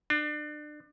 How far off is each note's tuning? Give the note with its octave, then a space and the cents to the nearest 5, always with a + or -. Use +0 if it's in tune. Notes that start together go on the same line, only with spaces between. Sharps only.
D4 +30